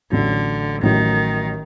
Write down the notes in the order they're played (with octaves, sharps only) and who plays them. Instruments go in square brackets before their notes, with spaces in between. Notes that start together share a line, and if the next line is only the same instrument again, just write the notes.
[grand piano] A1 A2 F#3 [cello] D3
[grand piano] A1 A2 F#3 [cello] D#3